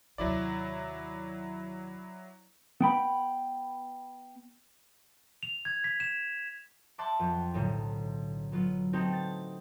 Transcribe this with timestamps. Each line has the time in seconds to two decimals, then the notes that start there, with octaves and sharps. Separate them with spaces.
0.18 D#2 C3 F#3 E4 D5
2.81 B3 G5 B5
5.43 F7
5.65 G#6
5.84 B6
6.00 E7
6.98 E5 F#5 A5 C6 D6
7.19 F2
7.54 B1 A2 D3
8.52 F#3 B3 F4
8.93 A3 B3 C4 D#4 F#4 G4
9.13 A6